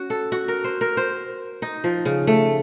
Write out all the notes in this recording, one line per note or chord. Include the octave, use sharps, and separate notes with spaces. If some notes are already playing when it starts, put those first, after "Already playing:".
Already playing: C#4 F#4
A4
F#4
A#4
C5
A#4
C5
D#4
F3
C#3
A3